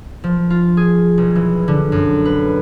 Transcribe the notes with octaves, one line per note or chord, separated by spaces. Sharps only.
F3
F4
G#4
B1
E3
D3
F#2
B4